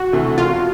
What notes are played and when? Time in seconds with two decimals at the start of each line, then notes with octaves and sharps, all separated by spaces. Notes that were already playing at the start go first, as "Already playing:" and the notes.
Already playing: F#4
0.13 D2 C3 E3 A3
0.38 E1 F4